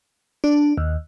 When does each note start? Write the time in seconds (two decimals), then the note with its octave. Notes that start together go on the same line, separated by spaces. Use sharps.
0.44 D4
0.78 D#2